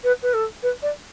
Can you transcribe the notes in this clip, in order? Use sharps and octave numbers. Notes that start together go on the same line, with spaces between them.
B4
B4
A4
B4
D5